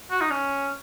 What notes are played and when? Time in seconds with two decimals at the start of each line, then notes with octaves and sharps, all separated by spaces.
0.11 F#4
0.21 D#4
0.30 C#4